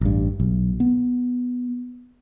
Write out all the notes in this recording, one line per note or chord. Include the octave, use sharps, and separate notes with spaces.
A1 G2
B1
B3